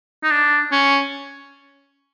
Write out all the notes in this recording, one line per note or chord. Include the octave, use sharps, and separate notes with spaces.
D#4
D4
C#4